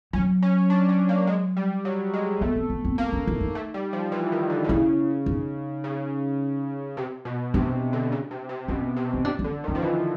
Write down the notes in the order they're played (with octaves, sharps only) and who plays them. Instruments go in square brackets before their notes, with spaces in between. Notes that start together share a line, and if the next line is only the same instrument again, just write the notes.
[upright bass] F#3 [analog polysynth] C#4
[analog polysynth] C#4
D4
C#4
A#3
G#3
G3
F#3
G#3
[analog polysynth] A3 [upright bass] B3
[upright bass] C4
B3
C4
[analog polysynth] A#3 [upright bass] C4
[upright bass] C#4
D#4
D#4
[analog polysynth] A3
G3
F3
E3
D#3
D3
D3
[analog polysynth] C#3 [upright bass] E4
[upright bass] D#4
[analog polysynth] C#3
C3
B2
[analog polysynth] C3 [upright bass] D4
[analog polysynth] D3
C#3
C3
C3
[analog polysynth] B2 [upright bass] C#4
[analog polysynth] C3
[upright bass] D#4
[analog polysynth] C3 [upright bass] D4
[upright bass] C#4
[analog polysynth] D3
D#3
[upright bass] C#4
[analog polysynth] F3
E3